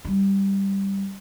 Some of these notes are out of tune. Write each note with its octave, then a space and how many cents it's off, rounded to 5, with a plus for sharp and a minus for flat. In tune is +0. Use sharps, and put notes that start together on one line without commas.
G3 +5 D#4 -30